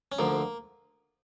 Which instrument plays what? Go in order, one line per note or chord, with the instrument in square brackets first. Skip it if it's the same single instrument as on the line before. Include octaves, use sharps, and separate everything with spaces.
[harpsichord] C#4
D2 D3 F3 A#3